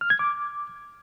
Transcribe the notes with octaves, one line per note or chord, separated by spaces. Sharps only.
F6
G#6
D6